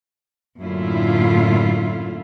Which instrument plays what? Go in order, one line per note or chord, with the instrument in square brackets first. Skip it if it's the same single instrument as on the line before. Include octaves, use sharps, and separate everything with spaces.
[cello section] F#2 A2 D3 A#3 E4 F4